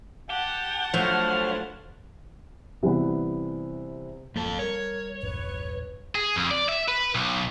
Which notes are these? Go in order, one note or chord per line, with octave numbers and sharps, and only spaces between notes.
G4 F#5 A5
G2 F3 F#3 A3 C5 C#5 F6
C3 E3 G3 B3
G#1 F2 F#3 A#3 A4
G3 A#4 C#5
A#1 E2 G2 B4
G#4
F2
D5
E5
B4
B1